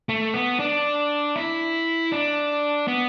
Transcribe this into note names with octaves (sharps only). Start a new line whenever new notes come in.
A3
B3
D4
E4
D4
B3